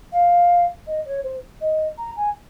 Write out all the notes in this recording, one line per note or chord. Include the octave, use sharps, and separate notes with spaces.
F5
D#5
C#5
C5
D#5
A#5
G#5